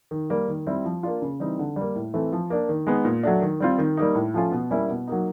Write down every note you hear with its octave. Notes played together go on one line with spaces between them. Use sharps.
D#3
G3 A#3
D#3
G3 C4 E4
F3
A#3 D4 F4
C#3
E3 G3 C4 D#4
D3
G3 A#3
A2
E3 A3 C4
F3
A#3 D4
D#3
G#3 B3 D#4
A#2
F#3 A3 D4
D#3
G3 C4 F4
D#3
G3 A#3 D#4
A2
F3 A3 C#4 F4
B2
G3 A#3 C#4 E4
B2
F#3 A#3 D#4